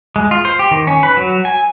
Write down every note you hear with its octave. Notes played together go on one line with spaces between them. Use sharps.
G#3
F4
C5
G4
D#3
C#4
B4
F#3
G#5